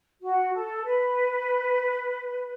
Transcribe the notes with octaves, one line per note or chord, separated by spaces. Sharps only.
F#4
A4
B4